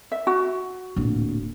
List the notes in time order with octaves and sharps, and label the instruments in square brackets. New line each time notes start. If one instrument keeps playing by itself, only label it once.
[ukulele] E5
F#4
[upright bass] D1 A#2